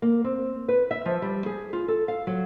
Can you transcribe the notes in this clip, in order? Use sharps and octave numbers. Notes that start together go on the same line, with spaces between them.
A#3
C4
B4
E5
F3
G3
G#4
F4
A4
F5
F#3